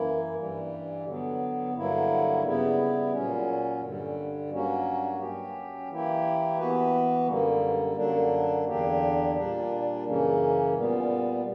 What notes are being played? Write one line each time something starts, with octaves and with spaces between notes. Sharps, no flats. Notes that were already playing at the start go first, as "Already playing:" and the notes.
Already playing: F#2 E3 A#3 E4
G2 E3 G3
D3 F#3 B3
G2 D3 F#3 A#3 E4
C#3 G3 B3 E4
A#2 F#3 C#4
G2 D3 G3
G2 F#3 A#3 C#4 F#4
F#3 C#4 G4
E3 A#3 E4 G4
E3 B3 F#4 B4
F#2 D3 G3 A#3
F#2 D3 F#3 A#3 D4
E2 D3 A#3 D4 G4
A#2 G3 A#3 D4
F#2 C#3 E3 A#3 C#4
A#2 G3 B3